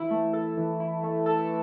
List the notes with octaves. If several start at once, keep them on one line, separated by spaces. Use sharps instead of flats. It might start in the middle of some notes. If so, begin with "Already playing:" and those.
Already playing: E3 E4
A3
A4
E3
E4
A3
A4